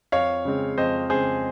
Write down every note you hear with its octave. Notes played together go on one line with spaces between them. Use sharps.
F2 C#5 F5
C#3 G#3 C4
F2 C5 D#5
C#3 G#3 C4 G#4 C5